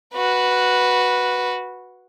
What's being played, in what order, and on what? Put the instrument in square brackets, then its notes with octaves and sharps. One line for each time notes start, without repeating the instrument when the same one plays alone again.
[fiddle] F#4 B4